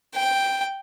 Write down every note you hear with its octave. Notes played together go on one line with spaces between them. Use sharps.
G5